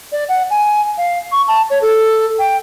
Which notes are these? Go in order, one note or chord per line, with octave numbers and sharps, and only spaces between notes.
D5
F#5
G#5
F5
C#6
A5
C#5
A4
G5